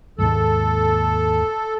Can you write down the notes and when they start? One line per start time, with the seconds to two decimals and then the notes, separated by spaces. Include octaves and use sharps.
0.18 D#2 G#2 G#3 A4